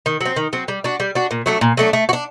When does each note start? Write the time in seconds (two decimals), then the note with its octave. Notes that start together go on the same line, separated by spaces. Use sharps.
0.06 D#3
0.21 F#3 C4
0.36 D#3
0.53 F#3 C4
0.68 G3
0.84 D4 F#4
1.00 G3
1.15 D4 F#4
1.31 A#2
1.46 F#3 A3 D4
1.61 A#2
1.77 F#3 A3 D4
1.93 A3
2.09 F#4
2.13 D4